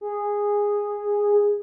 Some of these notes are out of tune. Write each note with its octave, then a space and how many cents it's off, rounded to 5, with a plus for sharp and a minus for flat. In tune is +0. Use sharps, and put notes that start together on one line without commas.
G#4 -10